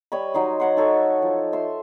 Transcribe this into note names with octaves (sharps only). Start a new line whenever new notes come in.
G3 C#5 D#5 B5
F#3 D#4 C6 D#6
C#5 F#5 C6
D#4 A4 C#5 C#6
F3
E5 C6